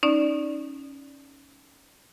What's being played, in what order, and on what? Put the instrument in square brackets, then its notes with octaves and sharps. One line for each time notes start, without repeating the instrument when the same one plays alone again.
[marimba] C#4 D#4 D5